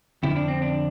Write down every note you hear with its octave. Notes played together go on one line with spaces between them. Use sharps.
F2 D3 F3 E4
D4
C4
D4